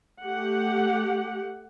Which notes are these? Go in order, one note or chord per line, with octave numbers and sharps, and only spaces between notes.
A3 G4 F#5